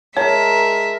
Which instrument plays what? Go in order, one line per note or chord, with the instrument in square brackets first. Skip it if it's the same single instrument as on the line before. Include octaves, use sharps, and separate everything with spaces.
[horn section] G#3 A#4 [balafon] C#5 [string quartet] E5 [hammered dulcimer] A5